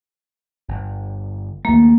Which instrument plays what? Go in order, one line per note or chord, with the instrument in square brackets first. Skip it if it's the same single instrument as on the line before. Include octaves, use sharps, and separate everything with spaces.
[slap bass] G1
[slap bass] D#2 A3 [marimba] A#3